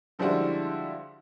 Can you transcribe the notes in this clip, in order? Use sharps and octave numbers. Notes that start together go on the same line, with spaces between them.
D3 F3 G3 G#3 E4 F#4